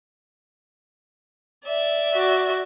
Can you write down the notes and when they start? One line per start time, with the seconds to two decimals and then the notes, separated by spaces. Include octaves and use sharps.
1.66 D5 E5
2.15 F#4